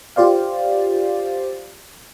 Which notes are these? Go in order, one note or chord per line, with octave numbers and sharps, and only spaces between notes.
F4 G4 C5 D5 F5